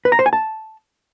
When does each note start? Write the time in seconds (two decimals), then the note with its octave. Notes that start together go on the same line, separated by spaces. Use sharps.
0.05 B4
0.12 A#5
0.19 C5
0.26 G#5
0.33 A5